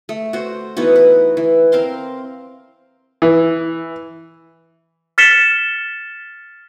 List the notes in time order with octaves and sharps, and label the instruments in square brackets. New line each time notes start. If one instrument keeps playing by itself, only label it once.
[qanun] A3
F#4 C5
E3 B3 D#4 F#4
B4
E3
C4 A#4 F5 C6
[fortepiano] E3
[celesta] F6 A6 B6 C#7 E7 G7